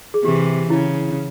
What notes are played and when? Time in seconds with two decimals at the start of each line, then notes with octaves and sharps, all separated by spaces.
0.14 G#4
0.24 C3 E3 G4
0.70 C#3 E4